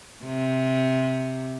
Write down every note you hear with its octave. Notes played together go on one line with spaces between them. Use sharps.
C3